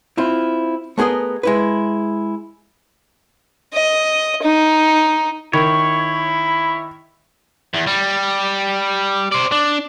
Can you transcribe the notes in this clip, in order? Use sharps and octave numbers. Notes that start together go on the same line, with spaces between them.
C4 E4 F4
A3 B3 G#4 A#4 D#5
G#3 E4 B4
D#5
D#4
D#3 E4 C#5
E2
G3
C5 D5
D4